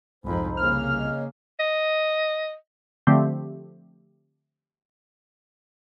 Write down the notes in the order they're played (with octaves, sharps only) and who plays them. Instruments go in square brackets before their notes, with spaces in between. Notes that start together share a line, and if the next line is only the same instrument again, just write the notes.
[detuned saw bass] C2 [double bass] F2 G#2 [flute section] D#4 C5 B5
[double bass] C#3 A#3 [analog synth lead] F6
[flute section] C#5 D#5
[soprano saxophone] D#5
[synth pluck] D3 F3 A3 C4 G4